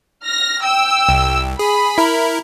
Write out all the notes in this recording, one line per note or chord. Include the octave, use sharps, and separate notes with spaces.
F6 A#6
G5 E6
C2
G#4 B5
E4 A#4